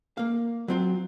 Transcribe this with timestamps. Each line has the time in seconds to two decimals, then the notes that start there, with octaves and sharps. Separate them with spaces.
0.17 A#3 F5
0.68 F#3 C4 F4